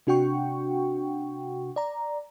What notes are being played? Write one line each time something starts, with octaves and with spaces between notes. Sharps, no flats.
C3 D4 F#4 F#5 G5 C#6
D5 A#5